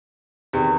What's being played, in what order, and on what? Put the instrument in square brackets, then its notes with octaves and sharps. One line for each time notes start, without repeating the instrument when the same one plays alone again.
[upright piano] E2 C3 D#3